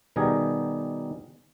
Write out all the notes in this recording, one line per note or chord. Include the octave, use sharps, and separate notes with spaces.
B2 D#3 G3 G4 G#4 A#4